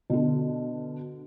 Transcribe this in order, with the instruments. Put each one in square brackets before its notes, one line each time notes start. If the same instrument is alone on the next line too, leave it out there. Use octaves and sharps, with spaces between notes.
[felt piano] B2 D3